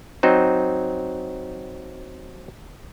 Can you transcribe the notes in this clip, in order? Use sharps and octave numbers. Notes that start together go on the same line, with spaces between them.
F#3 C4 D#4